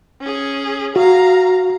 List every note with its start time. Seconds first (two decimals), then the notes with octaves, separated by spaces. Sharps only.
0.21 C#4 G#4
0.96 F#4 F5 A#5